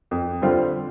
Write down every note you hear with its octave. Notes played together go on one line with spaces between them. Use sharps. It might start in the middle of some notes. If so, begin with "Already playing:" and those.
F2
D3 G3 C4 F4